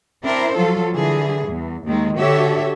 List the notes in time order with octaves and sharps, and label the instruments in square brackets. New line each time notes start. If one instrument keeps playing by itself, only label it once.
[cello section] C4 D4 E4 A#4 C5
F3 F#3 F4 A4
D3 E3 G3 G#4
E2
D#2 D#3 G#3
D3 F#4 G4 A4 C#5 E5